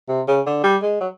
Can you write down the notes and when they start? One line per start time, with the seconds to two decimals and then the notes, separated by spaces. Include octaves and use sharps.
0.09 C3
0.28 C#3
0.46 D3
0.64 G3
0.82 G#3
1.01 F#3